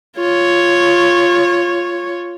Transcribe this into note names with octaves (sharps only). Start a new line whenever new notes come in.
F4 C#5